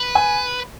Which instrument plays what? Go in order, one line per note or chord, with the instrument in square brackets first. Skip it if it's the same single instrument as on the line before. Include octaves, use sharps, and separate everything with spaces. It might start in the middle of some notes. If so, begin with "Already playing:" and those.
Already playing: [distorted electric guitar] B4
[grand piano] G#5